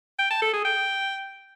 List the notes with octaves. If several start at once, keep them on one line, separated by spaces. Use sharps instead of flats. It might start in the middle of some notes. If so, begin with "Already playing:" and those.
G5
A5
A4
G#4
G5